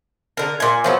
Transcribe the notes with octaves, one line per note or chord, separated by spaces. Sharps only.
D3 A#4
A#2 G#5
F3 F#3 B3